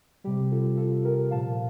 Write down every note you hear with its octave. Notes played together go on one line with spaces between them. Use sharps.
C3 G3 G4
F4 A4
F4 A4
G4 A#4
A#2 F3 F5 A5